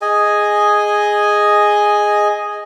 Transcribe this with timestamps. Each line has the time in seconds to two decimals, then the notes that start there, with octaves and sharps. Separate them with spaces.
0.02 G#4 D#5 G#5